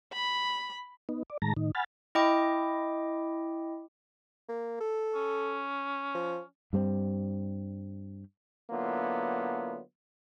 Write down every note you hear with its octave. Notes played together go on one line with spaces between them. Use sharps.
B5
B3 D#4
D5
A2 D#3 G#3 A5 A#5 A#6
A2 D#3 D#4
F#5 G#5 B5 F6 A6
E4 D#5 G5 D6
A#3
A4
C#4
F3
G2 G3 A#3 C4
D3 F#3 A#3 B3 E4 F4